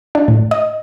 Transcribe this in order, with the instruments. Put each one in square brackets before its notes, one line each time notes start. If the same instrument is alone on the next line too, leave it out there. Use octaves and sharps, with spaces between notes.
[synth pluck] D4
A2
D#5